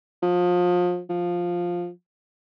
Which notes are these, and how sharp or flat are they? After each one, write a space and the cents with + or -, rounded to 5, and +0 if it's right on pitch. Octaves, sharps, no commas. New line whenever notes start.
F3 +30
F3 +5